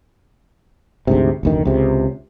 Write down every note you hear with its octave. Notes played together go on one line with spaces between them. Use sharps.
D2 G#2 C3
F1 D2 D#3
C#2 C3